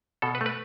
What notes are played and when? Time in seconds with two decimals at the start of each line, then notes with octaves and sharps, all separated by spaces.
0.22 B2 A4
0.35 B4
0.41 A3
0.46 B4